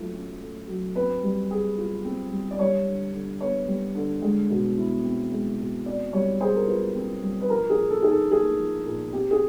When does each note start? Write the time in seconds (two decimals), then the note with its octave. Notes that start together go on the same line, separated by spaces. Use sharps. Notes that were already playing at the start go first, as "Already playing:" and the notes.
Already playing: F#3 A3 F4
0.13 C#4
0.41 A3
0.68 F#3
0.95 C4 B4
1.23 G3
1.51 G#4
1.78 F4
2.04 C4
2.32 G3
2.51 D5
2.59 G3 C#5
2.87 D3
3.13 D3
3.41 B3 C#5
3.68 G3
3.95 D3
4.22 G#3
4.50 B2
4.78 E4
5.04 C4
5.32 G#3
5.59 B2
5.85 C4 D5
6.13 G3 C#5
6.41 G#4 C5
6.56 A#4
6.67 F4 B4
6.95 C4
7.23 G3
7.41 B4
7.49 F3 A#4
7.70 G#4
7.76 A#2
7.90 A4
8.02 D#4 G#4
8.11 A4
8.31 A#3 G#4
8.58 F3
8.85 A#2
9.13 C4 G4
9.31 G#4